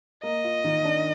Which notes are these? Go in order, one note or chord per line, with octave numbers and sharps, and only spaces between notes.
A#3 D#5
F4
D#3
D4